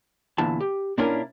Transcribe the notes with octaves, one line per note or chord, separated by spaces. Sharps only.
E2 A#2 D3 E3 A5
G4
A#2 C#4 D4 E4 A#4